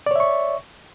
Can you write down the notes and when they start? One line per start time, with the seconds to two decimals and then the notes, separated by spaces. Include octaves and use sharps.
0.06 D5
0.11 C#5
0.16 E5
0.20 C#6